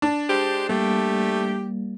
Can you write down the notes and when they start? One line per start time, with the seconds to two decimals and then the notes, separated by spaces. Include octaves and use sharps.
0.02 D4
0.29 G#3 G4 C5
0.69 G3 A3 A#3 G4